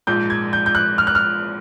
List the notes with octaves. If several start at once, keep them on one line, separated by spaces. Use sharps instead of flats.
A#1 G#2 F3 G6
G#6
G6
G6
F#6
F6
F#6
F6